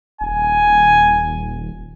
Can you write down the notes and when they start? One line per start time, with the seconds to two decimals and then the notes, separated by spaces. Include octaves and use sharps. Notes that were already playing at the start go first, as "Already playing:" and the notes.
0.21 D#1 G#5